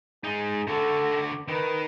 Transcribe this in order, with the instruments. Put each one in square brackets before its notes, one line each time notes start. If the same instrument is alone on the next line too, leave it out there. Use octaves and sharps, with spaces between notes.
[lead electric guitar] G#3 D#4 [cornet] G#4
[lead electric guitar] D3 F#4 [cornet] A4
[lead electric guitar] D#3 [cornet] B4